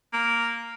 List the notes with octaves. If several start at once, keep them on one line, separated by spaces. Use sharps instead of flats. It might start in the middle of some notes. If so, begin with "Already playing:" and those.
A#3